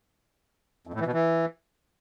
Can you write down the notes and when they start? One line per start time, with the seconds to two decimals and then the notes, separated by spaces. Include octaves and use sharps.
0.87 F2
0.94 A2
1.00 E3
1.07 B2
1.13 E3